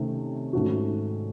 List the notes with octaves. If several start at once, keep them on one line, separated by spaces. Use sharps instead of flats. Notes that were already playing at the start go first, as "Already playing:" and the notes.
Already playing: C3 D#3 A3 C#4
G#2 D#3 A3 C#4 F#4